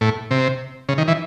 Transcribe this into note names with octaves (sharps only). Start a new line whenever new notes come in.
A2
C3
C#3
D#3
E3